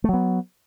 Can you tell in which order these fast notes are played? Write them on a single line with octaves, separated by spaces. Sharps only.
A3 F#3 B3